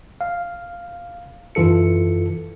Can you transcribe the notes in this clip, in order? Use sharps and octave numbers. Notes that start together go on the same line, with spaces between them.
F5
F#2 E3 F4 A4 C#7